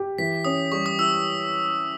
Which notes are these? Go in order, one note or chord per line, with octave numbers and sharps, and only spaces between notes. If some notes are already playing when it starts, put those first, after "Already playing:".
Already playing: G4
E3 B6
C#4 D#6
G3 C#6
D#6
E4 E6